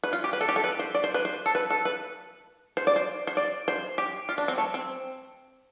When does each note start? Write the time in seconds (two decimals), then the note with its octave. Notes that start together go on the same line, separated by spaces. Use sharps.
0.04 B4
0.13 F4
0.24 G4
0.33 B4
0.41 A4
0.49 G4
0.56 A4
0.64 B4
0.79 C5
0.95 D5
1.04 C5
1.14 B4
1.25 C5
1.46 A4
1.55 B4
1.70 A4
1.85 B4
2.77 C5
2.87 D5
2.96 C5
3.27 C5
3.37 D5
3.68 C5
3.98 G4
4.29 F4
4.38 D4
4.48 C4
4.58 A3
4.74 C4